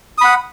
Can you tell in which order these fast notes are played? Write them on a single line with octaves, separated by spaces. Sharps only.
D#6 B5 F#5